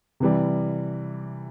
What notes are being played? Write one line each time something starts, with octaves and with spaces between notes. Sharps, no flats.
C3 E3 G3